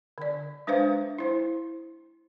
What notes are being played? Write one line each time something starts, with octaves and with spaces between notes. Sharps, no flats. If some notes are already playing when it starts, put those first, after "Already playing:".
D3 D5
G#3 D4 B4 C5 F5
E4 C5